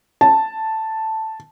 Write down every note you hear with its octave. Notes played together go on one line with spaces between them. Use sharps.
A5